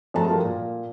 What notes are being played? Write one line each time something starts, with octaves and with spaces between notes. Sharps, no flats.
F2 G#3 A3 F#4 A5 A#5
F3 G3 F4 A4 A#4
A#2